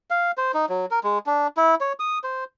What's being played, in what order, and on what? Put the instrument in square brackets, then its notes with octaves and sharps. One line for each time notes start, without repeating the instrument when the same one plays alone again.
[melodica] F5
C5
D#4
F#3
A#4
G#3
D4
E4
C#5
D#6
C5